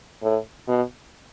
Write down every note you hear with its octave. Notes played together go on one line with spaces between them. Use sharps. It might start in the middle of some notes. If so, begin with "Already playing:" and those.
A2
B2